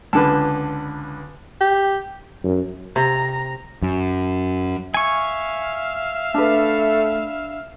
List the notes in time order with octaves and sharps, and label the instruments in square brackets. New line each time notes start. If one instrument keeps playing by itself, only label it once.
[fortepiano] C#2 D3 B4 [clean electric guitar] A5
[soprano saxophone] G4
[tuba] F#2
[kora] C3 [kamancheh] A#5
[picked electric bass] F#2
[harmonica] E5 F5 [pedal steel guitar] G#5 C#6
[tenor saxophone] A3 [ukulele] D4 B4